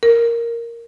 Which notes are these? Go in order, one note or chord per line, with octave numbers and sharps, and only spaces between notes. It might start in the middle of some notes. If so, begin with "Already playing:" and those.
A#4